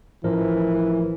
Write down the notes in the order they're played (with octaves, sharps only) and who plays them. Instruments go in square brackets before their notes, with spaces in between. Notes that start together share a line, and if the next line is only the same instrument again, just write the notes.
[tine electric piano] A1 F3 A#4 [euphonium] E3